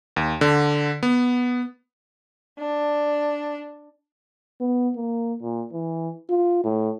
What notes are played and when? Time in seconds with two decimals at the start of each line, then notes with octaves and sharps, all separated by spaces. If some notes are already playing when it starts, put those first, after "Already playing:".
0.16 D#2
0.41 D3
1.03 B3
2.59 D4
4.61 B3
4.96 A#3
5.42 A#2
5.73 E3
6.30 F4
6.64 A2